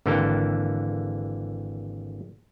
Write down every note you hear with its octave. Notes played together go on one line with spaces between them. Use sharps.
G#1 D3 E3 A#3 G5 A5